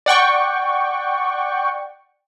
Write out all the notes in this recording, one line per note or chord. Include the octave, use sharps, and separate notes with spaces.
D5 F#5 G5 C#6